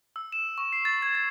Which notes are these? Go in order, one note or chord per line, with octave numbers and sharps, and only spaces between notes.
E6
E7
C#6
C7
A6
G#6
A6